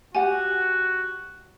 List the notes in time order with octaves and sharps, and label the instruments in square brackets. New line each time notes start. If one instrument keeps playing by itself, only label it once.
[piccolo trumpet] F#4 [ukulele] G4 F#5 [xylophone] G#5